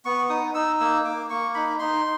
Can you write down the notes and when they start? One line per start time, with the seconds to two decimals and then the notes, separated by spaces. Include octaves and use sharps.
0.05 B3 C#6
0.29 D#4 D#6
0.55 D#4 E6
0.80 A#3 E6
1.04 A#3 D6
1.30 A#3 C#6
1.54 D#4 B5
1.79 D#4 C6